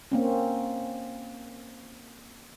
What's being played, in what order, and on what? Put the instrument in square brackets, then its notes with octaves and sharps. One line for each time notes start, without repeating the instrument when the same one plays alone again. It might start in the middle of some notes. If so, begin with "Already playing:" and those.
[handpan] A#3 C4 C#4